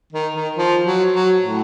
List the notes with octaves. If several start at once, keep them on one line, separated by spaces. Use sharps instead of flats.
D#3
D#3
F3
F#3
F#3
A2